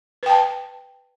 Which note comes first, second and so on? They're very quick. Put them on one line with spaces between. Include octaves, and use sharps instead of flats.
B4 G5 A5